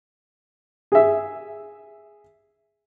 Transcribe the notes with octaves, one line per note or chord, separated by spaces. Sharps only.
G#4 E5